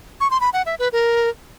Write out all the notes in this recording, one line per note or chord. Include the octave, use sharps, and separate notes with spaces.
C#6
C6
B5
F#5
E5
B4
A#4